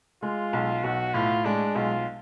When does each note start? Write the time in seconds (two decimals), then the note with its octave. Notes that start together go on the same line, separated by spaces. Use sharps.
0.22 G#3 F4
0.53 B1
0.84 B1 F#4
1.14 A2 F4
1.45 G#3 D4
1.76 B1 F4